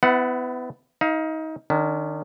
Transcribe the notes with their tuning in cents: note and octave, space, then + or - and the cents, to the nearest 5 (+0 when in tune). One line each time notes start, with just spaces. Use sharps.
B3 +30 E4 +0 F#5 +0
D#4 +30 F5 +0
D#3 -25 C#4 +45